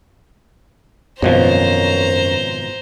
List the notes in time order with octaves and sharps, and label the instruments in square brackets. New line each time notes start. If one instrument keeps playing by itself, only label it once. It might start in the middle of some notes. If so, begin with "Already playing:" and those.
[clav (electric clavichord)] G#1 B2 F3 [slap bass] F#2 [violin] C5 A#5 [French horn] C#5